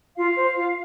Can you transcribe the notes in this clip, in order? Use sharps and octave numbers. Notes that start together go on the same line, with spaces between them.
F4 F5
C5
F4